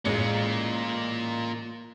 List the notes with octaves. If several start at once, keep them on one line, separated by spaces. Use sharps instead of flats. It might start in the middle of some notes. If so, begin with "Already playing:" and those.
A1 G#3 A#3 F4 C#7